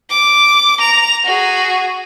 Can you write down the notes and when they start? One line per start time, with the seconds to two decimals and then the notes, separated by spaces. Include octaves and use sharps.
0.10 D6
0.80 A#5 F7
1.24 F#4 G#4